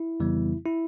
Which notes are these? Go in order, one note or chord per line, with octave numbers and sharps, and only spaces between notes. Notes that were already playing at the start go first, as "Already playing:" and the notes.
Already playing: E4
F2 C#3 E3 G3 B3
E4